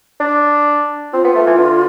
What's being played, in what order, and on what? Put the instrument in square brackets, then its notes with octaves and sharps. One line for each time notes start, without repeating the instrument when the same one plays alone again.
[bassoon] D4
[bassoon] C4 [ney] F4
[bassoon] B3
A3
E3
D3